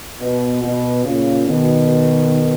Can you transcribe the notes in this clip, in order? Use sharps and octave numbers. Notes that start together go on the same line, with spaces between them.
B2
B2
A#2 C#3
B2 D#3